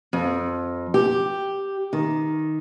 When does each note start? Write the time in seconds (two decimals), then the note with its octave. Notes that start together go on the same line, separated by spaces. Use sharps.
0.13 F2
0.94 G4
1.93 D#3